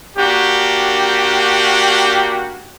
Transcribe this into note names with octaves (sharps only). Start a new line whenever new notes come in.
A#3 D4 F#4 G4